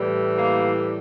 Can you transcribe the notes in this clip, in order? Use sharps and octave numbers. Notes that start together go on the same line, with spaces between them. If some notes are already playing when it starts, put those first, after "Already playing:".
Already playing: A2 E3 G3
A#3